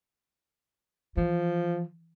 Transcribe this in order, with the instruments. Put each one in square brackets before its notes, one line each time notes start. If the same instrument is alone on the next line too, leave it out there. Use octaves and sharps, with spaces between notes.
[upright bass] E3 [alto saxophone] F3